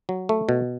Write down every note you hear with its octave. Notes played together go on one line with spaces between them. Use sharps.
F#3
A3
B2